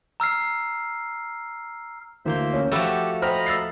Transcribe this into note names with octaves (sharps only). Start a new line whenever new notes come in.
A#5 E6 F6 C7
D2 E3 A#3 C5 E5 G6
C#4
F3 A3 F#4 G4 E5 F#5 B5 E6
C5 D#5 G5 A#5 B5 F6
E6 A6 C7